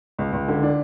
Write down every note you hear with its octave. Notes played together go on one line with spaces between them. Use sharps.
C#2
C#2
D3
D4